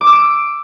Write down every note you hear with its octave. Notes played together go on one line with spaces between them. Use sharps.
D6
E6
D7